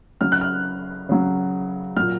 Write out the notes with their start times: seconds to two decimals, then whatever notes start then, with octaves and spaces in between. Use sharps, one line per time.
0.21 C#3 F#3 F6
0.32 F#6
0.41 F6
1.09 C#3 F#3
1.97 F#3 F6
2.02 A#2